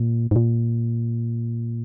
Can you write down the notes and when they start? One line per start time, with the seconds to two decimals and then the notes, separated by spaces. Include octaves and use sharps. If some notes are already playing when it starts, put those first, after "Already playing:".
Already playing: A#2
0.31 G#2
0.36 A#2